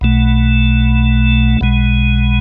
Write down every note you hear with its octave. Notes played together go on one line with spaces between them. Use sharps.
B1 B2 A3
B1 B2 G#3